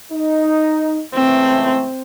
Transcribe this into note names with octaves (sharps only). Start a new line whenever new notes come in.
D#4
C#2 E3 A3 C4